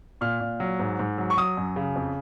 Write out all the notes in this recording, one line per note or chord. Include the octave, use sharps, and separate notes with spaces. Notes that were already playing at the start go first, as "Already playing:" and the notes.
A#2 F6
A#2
F#3
G#2
G#2
F#3
C#6
F#3 D#6
F#2
C#3
F2